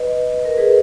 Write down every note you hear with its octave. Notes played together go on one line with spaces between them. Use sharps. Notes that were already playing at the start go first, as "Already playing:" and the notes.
Already playing: B4 D#5
A#4
G#4 B4